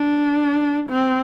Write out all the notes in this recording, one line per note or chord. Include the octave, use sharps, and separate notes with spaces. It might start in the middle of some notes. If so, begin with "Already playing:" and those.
Already playing: D4
C4